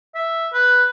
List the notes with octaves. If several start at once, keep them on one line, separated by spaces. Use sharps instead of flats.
E5
B4